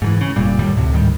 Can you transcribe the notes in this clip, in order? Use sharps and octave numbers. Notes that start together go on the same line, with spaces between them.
G#2 D#3 E3
C#3
F1 A#2 G3
F#2 A2 D#3 G3
D2 A2 C3
D2 G#2 D#3 G3